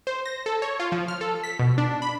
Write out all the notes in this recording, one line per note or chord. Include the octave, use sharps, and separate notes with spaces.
C5
A#6
A4
C#5
F4
F3
F6
A4
B6
B2
D4
B5